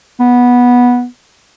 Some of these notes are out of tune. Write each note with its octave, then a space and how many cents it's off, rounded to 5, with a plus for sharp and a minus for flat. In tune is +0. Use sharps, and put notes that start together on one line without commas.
B3 -10